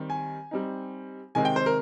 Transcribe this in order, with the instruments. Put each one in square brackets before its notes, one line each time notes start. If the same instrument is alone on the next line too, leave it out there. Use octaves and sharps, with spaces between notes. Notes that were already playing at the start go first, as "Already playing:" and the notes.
Already playing: [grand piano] D#3 G3 C4
G#5
G3 C4 D#4
C3 D#3 G#3 C4 G#5
G5
C5
A#4